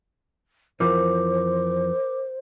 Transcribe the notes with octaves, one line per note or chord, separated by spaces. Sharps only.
F2 E3 F3 A#4 C5 D6